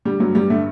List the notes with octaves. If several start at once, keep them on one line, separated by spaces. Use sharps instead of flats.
D3 G3
G2 F#3
G2 G3
D3 A3